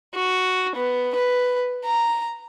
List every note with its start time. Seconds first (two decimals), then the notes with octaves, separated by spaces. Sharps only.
0.14 F#4
0.76 B3
1.16 B4
1.85 A#5